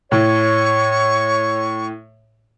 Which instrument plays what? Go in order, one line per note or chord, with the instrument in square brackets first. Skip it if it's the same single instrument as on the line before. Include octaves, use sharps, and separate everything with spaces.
[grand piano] A2 [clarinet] C#5 [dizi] C#6